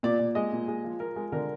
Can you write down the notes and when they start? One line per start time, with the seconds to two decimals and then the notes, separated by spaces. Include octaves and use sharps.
0.03 A#2 D5
0.19 A#2
0.35 G#3 D#5
0.52 A#2
0.68 G#3
0.84 F3
1.00 F3 A#4
1.16 G#3
1.32 D3 A#4